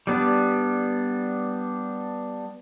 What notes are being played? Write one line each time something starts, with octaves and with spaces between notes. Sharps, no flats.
G3 B3 D4